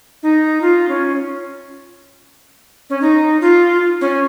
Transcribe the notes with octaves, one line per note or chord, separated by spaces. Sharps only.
D#4
F4
C#4
C#4
D#4
F4
C#4